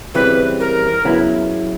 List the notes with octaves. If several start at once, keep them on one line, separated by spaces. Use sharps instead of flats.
C#3 E3 G3 C4 B4
A#4
C#3 F#3 B3 E4